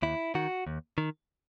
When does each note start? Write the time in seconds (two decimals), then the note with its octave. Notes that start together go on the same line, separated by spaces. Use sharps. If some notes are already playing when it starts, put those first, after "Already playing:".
0.02 D#2 E4
0.35 D#3 F#4
0.67 D#2
0.98 D#3